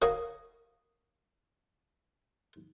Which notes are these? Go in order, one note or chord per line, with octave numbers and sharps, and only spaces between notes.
F#4 A#4 C#5 F5 A#5 D#6